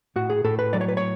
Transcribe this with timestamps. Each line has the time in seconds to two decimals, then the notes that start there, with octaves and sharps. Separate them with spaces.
0.16 A2 F#4
0.30 G#4
0.44 A2 A4
0.59 B4
0.73 F#3 D5
0.81 C#5
0.88 B4
0.97 C#5